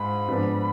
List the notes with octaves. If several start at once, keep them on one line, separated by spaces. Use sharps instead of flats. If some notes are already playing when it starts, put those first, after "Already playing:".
Already playing: G#2 G#3 F4 B5
G#2 F3 B3 D4